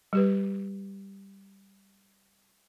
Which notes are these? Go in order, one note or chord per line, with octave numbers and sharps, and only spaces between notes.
G3 G4 B4